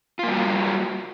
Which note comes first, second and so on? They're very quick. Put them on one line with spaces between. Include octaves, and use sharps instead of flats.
F4 A#3 G3 F#4